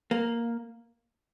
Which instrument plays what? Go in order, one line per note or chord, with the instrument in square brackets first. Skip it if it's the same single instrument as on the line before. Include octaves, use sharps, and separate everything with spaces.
[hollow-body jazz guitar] A#3